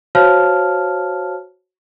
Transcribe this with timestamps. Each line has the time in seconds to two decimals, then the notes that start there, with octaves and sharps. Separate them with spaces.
0.15 F#4 C5 C#5 F5 A5 F6